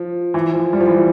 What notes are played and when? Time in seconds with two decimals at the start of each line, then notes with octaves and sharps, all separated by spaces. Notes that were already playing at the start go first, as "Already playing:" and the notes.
Already playing: F3
0.34 E3
0.53 F3
0.73 G3
0.80 F3
0.88 E3
0.94 F3